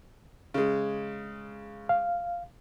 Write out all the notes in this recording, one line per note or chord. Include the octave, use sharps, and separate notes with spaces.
C#3 G#3
F5